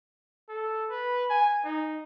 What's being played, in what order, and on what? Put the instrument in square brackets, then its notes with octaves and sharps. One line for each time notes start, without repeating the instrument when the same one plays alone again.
[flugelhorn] A4
B4
G#5
D#4